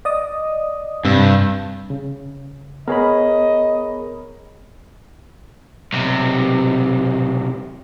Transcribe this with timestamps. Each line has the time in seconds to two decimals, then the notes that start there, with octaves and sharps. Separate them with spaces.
0.05 D5 D#5 D#6
1.05 G2 C3 E6
1.90 C#3
2.88 B3 G#4 A#4 C#5 D#5 B5
5.93 B1 C3